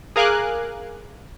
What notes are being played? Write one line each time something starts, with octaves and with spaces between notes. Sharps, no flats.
G#4 A#4 F5 G#5 D6 F#6